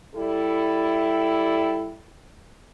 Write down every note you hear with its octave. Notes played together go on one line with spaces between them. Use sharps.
G3 E4 A4